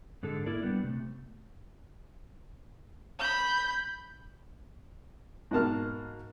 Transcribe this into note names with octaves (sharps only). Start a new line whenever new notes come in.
G#2 D3 G#3 A4
A#3 E4 A#4 D5
G3 B3 D4
C3 A3
B5 G6
G#2 B2 A#3 A5 F6